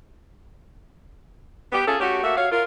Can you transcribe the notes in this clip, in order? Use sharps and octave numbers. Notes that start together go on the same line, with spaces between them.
B3 G4
C#4 F4 G#4 A4
A3 C#4 F#4 G4
A3 A#3 F#4 E5
F#4 C#5 F5
F4 A#4